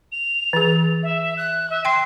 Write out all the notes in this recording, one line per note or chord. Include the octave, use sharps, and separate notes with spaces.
F7
E3 G#4
E5
F#6
E5
G5 C6 C7